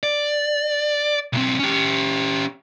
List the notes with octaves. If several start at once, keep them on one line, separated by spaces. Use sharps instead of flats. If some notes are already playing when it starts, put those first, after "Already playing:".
D5
B1 C4
C#4 G4